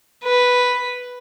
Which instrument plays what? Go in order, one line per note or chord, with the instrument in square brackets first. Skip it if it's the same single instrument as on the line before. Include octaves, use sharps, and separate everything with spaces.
[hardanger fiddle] B4